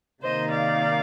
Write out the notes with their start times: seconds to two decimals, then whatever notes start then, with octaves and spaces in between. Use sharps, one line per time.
0.23 C3 D#3 A#3 D#4 C5 D#5
0.51 D5 F5